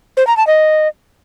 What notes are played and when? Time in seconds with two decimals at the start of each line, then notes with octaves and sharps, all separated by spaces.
0.17 C5
0.27 A#5
0.37 A5
0.47 D#5